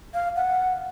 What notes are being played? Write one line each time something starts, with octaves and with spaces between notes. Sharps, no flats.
F5
F#5